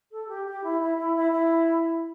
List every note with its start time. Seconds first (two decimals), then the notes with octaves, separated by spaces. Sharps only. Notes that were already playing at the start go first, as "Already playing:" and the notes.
0.11 A4
0.28 G4
0.45 G4
0.63 E4
0.79 E4
0.98 E4
1.15 E4
1.31 E4